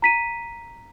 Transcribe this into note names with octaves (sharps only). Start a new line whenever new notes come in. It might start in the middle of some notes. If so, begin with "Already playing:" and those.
A#5 B6 D#7